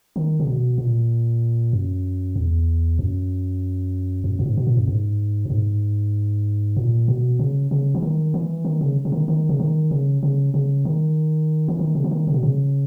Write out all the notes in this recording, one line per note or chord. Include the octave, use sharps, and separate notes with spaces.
D#3
C#3
B2
A#2
F#2
E2
F#2
F#2
A#2
G#2
B2
A#2
F#2
G#2
F#2
G#2
A#2
B2
C#3
C#3
E3
D#3
E3
D#3
C#3
C#3
D#3
D#3
C#3
D#3
C#3
C#3
C#3
D#3
E3
D#3
C#3
E3
D#3
C#3
B2
C#3